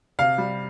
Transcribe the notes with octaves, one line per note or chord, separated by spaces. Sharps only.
C3 F5
G3